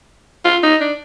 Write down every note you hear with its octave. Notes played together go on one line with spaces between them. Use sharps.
F4
D#4
D4